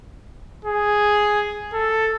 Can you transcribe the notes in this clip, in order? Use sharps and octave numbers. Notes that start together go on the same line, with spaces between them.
G#4
A4